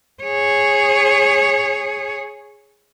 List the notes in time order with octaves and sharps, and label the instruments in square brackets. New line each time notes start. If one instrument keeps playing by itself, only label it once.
[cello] G#4 C#5